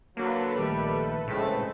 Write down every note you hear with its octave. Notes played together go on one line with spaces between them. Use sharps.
D3 F#3 A#3 A4 B4
A#1 D#3 G3 A3
A2 C#3 G#3 A3 C4